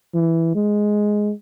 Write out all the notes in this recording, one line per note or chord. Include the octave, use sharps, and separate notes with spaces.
E3
G#3